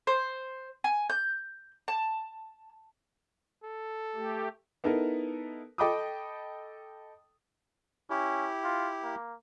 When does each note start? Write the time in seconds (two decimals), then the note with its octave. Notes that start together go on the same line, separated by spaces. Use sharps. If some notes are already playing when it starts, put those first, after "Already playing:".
0.07 C5
0.84 G#5
1.10 G6
1.88 A5
3.63 A4
4.15 A3 G4
4.84 B3 D#4 E4 A4 A#4
5.78 A4 D#5 G5 B5 D6 D#6
8.10 C#4 E4 G4
8.64 F4
9.03 A#3